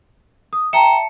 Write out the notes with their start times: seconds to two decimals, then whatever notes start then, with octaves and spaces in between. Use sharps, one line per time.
0.53 D#6
0.73 E5 G5 A5 A#5 C#7